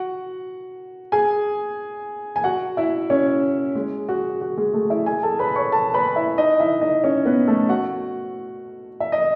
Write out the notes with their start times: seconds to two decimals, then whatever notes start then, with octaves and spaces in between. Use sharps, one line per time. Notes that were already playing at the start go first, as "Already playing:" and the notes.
Already playing: F#4 F#5
1.12 G#4 G#5
2.36 G#5
2.44 F#4 F#5
2.77 E4 E5
3.10 C#4 C#5
3.75 G#3 G#4
4.09 F#4
4.41 F#4
4.57 G#3 G#4
4.73 A3 A4
4.90 E4 E5
5.06 G#4 G#5
5.23 A4 A5
5.39 B4 B5
5.55 C#5 C#6
5.72 A4 A5
5.94 B4 B5
6.16 E4 E5
6.38 D#4 D#5
6.60 E4 E5
6.81 D#4 D#5
7.04 C#4 C#5
7.25 B3 B4
7.47 A3 A4
7.69 F#4 F#5
9.00 E5
9.12 D#5